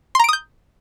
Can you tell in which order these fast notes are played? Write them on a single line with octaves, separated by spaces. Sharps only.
C6 A#5 D7 D#6 G6